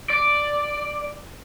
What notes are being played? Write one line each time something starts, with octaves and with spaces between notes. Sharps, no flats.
D5